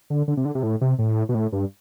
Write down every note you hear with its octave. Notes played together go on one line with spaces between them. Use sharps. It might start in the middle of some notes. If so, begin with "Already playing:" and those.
D3
D3
C3
D3
C3
A2
C3
A2
B2
A2
G2